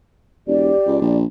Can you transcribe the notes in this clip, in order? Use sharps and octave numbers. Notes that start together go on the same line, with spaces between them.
E1 G4 D5
C#2
A#1